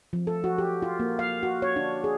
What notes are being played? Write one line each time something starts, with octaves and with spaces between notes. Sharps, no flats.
F3
A4
F#4
G4
F4
A#3
F5
F#4
C#5
D4
G#4